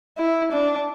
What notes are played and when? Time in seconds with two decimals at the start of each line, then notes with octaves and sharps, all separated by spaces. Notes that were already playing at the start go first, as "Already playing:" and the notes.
0.18 E4
0.52 D4